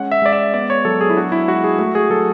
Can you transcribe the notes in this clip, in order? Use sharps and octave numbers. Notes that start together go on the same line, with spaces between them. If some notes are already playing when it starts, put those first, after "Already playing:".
Already playing: G#3 C#4 F#5
E5
G#3 D5
E5
B3 D5
C#5
F#3 A4
G#4
E4
D4 F#4
E4
G#3 F#4
G#4
A3 F#4
G#4
F#3 A4